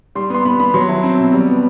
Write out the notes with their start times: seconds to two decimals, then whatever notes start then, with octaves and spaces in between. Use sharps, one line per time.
0.15 G3 C6
0.30 B3 C6
0.45 B3 B5
0.60 B3 B5
0.74 F#3 C6
0.89 E4 A5
1.03 C4
1.18 B2
1.33 G3
1.47 B3